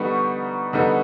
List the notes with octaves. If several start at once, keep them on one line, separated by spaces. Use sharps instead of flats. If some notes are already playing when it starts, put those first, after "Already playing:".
Already playing: D3 G3 B3 D#4 C#6
D3 G3 B3 D#4